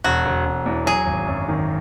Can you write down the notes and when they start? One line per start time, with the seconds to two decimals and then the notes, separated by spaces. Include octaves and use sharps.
0.04 E1 F#4
0.25 E1
0.45 E1
0.66 E2
0.86 F#3 G#4
1.07 G#1
1.27 F#2
1.49 D#3